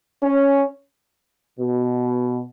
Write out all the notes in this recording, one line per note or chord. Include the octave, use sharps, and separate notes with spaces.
C#4
B2